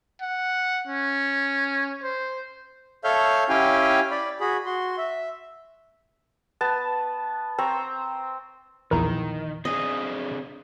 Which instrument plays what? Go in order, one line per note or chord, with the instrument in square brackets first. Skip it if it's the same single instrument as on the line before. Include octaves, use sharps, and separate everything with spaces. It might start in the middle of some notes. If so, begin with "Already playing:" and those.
[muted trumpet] F#5
C#4
C5
[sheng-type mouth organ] A4 C#5 E5 F5 F6 G6
C#4 E4 G4 F5 G5 G#5
D5 B5
F#4 G#4 B5
F#4 C6
E5
[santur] B3 A5
C4 C5 A#5 C#6
[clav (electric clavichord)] A#1 E2 E4 [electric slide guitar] D#3 [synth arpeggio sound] A#4 A#5
[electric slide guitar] C4 D4 G#4 [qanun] D#5